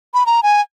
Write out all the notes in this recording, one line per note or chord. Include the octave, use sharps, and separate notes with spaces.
B5
A#5
G#5